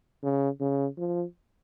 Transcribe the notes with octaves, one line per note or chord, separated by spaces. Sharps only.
C#3
C#3
F3